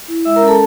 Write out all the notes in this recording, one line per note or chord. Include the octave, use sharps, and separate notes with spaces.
E4
G#3 E5 E6
A#4 A#5
C#4
A4 A5